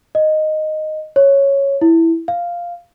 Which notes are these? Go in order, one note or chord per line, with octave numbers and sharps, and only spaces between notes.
D#5
C#5
E4
F5